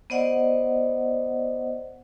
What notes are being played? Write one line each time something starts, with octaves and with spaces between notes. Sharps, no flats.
B3 C5 D5 D#5 F#5